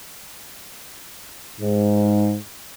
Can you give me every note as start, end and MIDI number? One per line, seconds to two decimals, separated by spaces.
1.60 2.35 44